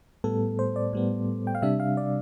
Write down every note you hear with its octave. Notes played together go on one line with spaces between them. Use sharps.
A2 G3 B3 A4
C5
D5
A2 G3 B3
G5
F5
C3 G3 D4 E5
F5
D5